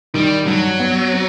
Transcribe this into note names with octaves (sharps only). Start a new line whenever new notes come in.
D#3 G3
G2 F#3
B3
C4